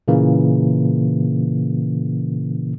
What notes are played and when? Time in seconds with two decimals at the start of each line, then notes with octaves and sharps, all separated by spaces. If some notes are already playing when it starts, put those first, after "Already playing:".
0.08 A#2 C#3 E3 A#3